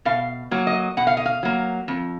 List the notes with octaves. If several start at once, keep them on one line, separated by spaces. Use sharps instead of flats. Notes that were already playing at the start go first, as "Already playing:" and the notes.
B2 F5
F#3 A#3
D#5
B2 F#5
F5
D#5
F5
F#3 A#3
F2